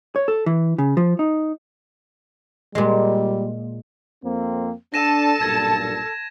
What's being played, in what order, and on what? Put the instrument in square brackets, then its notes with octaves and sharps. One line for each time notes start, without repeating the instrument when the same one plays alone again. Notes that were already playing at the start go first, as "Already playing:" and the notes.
[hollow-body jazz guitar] C#5
A4
E3
C#3
F3
D#4
[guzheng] A#2 G#3 [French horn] G3
[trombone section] F2 A#3 C4
[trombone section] D4 [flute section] A4 [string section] A5 [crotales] A#6 D#7 E7
[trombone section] B1 G2 A#2 [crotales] G#6 A#6